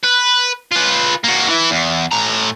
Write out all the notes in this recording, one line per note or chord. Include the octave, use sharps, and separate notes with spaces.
B4
F4 B4
A#3 F#4
E3 E4
E2
A2 A#5